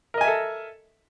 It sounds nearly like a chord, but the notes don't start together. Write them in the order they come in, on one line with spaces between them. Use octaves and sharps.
A#4 D#5 G#5 E5 A4